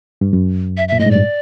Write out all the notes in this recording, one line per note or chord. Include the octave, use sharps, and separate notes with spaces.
G2
F#2
E5
A#2 E5
A2 D#5
G#2
G2 D5